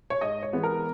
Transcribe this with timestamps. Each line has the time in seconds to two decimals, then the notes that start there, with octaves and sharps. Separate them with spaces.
0.10 C#5
0.21 G#2 D#5
0.43 C#5
0.53 E3 G#3 B3
0.63 A#4